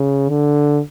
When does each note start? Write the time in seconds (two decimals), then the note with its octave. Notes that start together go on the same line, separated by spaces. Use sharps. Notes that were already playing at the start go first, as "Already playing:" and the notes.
Already playing: C#3
0.29 D3